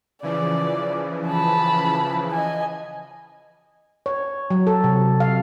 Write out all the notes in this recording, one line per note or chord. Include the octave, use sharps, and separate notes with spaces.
C#3 E3 F3 D5
A5 B5
D#5 G#5
C#5
F#3
A4
C3
F5